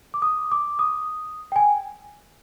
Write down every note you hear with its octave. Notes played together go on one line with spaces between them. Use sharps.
D6
D#6
D6
D#6
G5
G#5